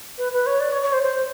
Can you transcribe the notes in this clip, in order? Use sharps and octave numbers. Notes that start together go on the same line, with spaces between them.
B4
B4
C#5
D5
C#5
C#5
C5
C5